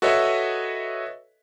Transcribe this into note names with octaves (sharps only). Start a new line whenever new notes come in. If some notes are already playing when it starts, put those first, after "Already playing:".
F#4 A4 B4 C#5 D#5 E5